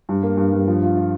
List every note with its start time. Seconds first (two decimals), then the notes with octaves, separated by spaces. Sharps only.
0.09 G2
0.23 A#3
0.37 G2
0.53 G2
0.67 F3
0.83 F4
0.96 F4